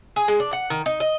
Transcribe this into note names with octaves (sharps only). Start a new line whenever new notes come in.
G#4
G#3
D4
F#5
D#3
D#4
D#5